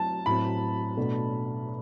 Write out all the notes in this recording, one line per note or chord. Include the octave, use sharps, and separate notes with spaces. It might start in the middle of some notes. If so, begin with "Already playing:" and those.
Already playing: F#3 C4 E4 A5
A2 F#3 C4 B5
B2 A3 D4